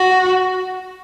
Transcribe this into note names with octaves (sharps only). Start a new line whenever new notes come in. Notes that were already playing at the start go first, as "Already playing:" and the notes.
Already playing: F#4